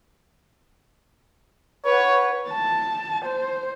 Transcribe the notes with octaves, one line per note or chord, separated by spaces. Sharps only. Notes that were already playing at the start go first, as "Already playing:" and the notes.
B4 C#5 F#5
A5
C5